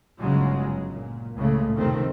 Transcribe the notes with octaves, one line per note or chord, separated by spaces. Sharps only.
G1 C#3 F#3 G#3
A#2
C#2 A2 C#3 G#3 A3
F1 D#3 A3 C4